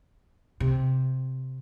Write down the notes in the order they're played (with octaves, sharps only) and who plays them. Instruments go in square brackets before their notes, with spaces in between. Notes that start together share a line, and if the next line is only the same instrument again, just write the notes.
[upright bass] C3